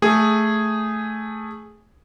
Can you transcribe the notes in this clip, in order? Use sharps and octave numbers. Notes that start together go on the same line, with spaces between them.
A3 G#4